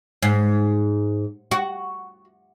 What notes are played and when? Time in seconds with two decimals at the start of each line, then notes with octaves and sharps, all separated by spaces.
0.23 G#2
1.51 F#4